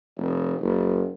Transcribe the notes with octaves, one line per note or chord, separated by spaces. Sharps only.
F1
F#1